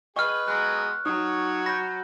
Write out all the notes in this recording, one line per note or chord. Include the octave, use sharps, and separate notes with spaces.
G#4 B4 D#5 G5 C#6 F6
F#3 G#3 B3 F#6
F#3 D#4 C#5 D#6
B5 G6 A#6